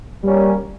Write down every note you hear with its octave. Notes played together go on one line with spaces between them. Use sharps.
G3 A#3 C#4